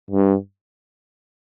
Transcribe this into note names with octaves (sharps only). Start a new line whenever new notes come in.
G2